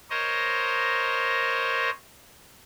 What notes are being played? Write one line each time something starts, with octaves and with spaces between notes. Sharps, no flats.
A#4 C5 C#5 D#5